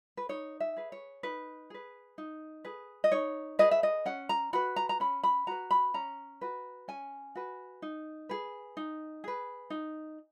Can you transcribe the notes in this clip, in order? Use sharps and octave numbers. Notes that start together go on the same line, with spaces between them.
B4
D#4 C#5
E5
G#4 B4
C#5
D#4 B4
G#4 B4
D#4
G#4 B4
D#5
D#4 C#5
G#4 B4 D#5
E5
D#5
C#4 F#5
A#5
F#4 B4 B5
A#5
A#5
C#4 B5
B5
F#4 B4 A#5
B5
C#4 A#5
F#4 B4
C#4 G#5
F#4 B4
D#4
G#4 B4
D#4
G#4 B4
D#4